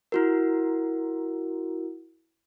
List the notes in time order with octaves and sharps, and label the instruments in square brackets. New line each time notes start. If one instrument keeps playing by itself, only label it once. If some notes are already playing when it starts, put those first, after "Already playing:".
[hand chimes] E4 F#4 A#4